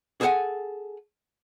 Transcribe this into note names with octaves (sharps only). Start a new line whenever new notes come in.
G#4 A4 C5 E5 F#5 G#5